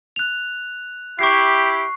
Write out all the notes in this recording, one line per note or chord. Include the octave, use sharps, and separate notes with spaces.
F#6 F7
E4 G4 C#6 C7